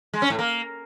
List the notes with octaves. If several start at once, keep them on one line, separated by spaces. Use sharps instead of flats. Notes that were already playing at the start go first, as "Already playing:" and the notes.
G#3
C#4
A2
A#3